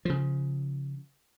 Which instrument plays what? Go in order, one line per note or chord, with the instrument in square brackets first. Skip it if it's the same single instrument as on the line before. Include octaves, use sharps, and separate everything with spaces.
[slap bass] C#3 F3